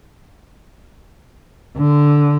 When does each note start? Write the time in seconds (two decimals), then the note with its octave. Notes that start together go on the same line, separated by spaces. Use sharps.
1.77 D3